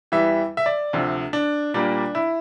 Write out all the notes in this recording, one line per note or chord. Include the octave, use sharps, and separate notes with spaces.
E2 E3 G3 E5
E5
D5
D2 C3 F3
D4
A#2 G3 A#3 D4
E4